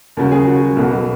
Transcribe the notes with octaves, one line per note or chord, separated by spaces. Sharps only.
D#2 C#3 F#3 A#3 A#4
G#4
F#4
B1 B2 F#3 A#3